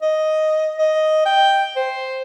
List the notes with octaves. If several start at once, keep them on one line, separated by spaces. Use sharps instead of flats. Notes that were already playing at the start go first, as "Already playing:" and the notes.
D#5
D#5
G5
C5